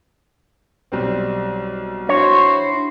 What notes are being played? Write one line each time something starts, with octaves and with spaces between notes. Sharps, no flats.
B1 G3 C4
D4 E4 F#4 C5 C#5